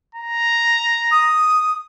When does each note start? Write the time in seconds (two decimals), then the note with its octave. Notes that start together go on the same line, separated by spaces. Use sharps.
0.15 A#5
1.11 D#6